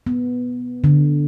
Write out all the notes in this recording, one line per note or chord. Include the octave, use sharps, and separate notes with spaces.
B3
D3